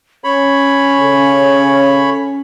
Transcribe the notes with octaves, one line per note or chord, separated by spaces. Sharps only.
C#4 C#5 B5
C#3 A4